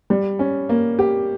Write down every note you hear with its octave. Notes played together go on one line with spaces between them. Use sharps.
G3
C#4
A#3
G4